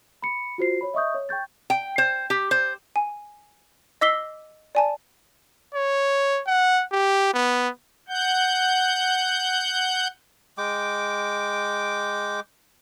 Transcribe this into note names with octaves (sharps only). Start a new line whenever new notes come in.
B5 C#7
F4 F#4 C5 C7
C#5 B5
D#5 E5 C#6 D#6 G6
C#5
G5 C#6 G6 A6
G5
C5
G4
C5
G#5
D#5 D6 E6 B6 C7 G7
D5 G#5 A5
C#5
F#5
G4
B3
F#5 G6
G#3 G5 D6